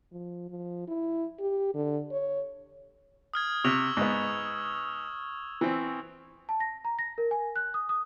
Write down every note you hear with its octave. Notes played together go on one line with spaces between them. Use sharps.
F3
F3
E4
G4
D3
C#5
D#6 F6 G#6
C3 C#6 E6 F7
G#2 B3
E3 C4
A5
A#6
A#5
A#6
A#4
G#5
F#6
D#6
D#6